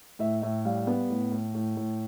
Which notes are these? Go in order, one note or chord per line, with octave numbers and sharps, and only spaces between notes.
A2 E5
A2 E5
G3 F5
B3
A2
A2
A2
A2